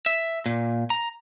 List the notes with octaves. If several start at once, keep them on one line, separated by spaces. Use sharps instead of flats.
E5
A#2
A#5